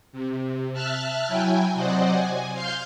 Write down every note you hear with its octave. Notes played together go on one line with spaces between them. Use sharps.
C3
E5 A5 F6 F#6
F#3 E4 G5 G#5
C3 F#3 C5 D5 D#5 F#5
G#5
F5 C6 F6 G6